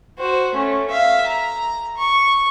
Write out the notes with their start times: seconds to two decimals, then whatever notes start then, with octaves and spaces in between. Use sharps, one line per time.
0.19 F#4 C5
0.54 A3 C#4
0.90 E5 F5
1.27 A#5
1.97 C#6